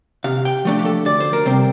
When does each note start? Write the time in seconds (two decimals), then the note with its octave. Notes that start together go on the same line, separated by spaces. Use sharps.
0.24 C3 F5
0.45 G5
0.65 F3 A3 D4
0.79 G4
0.85 A4
1.05 D2 D5
1.20 C5
1.33 A#4
1.46 C3 G3 C4